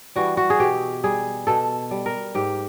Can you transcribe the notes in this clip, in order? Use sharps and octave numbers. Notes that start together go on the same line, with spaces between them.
E3 G3 F#4
F#4
G#4
B2 G4
G3 G#4
B2 A4
G3
A#4
G#2 G4